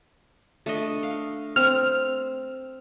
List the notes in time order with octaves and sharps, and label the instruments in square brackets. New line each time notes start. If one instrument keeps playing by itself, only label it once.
[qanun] A3 D4 D#5
F5
[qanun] C4 [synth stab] F6